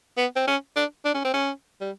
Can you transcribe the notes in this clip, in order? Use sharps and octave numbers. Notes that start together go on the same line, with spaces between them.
B3
C4
C#4
D4
D4
C#4
C4
C#4
G3